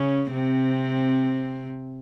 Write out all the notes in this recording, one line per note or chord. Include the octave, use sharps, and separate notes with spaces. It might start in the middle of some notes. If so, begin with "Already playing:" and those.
Already playing: C#3 C#4
C3 C4